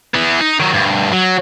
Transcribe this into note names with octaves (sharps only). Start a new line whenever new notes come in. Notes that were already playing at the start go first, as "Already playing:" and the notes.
E3 B3
D#4
D#3 F#3
D2 G2
F#3